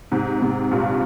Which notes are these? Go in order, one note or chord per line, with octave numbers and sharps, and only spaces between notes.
G#2 C3
G#2 C3
G2 A#2